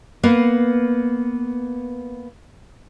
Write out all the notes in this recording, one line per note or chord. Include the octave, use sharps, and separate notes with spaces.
A#3 B3 B4 F5